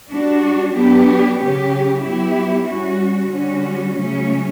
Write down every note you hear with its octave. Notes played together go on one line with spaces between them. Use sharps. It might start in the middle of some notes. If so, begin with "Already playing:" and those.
G3 D4 F#4
F#3 B3 D4 G4
C#3 F#3 C#4 G4
F#3 B3 E4 G4
G3 C#4 F#4
D3 G3 C#4 F#4
C#3 F#3 A3 C#4